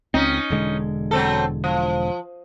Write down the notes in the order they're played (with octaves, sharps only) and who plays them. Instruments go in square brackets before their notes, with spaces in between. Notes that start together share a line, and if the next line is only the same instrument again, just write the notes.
[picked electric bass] C#2 C4 [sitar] C#4 D#4
[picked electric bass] E1 D3 G#3
[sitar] F#3 C4 A4
F3